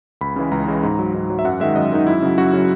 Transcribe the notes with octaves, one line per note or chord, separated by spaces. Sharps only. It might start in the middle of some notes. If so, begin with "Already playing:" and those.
C#2 B5
C#3 E3 G#3
C#2 A#5
C#3 E3 G#3
G#2
F#3
G#2
F#3
E5
F#2 F#5
D#3 G#3 E5
F#2 D#5
D#3 G#3 D#4
F#2 E4
C#3 F#3
F#2 F#4
C#3 F#3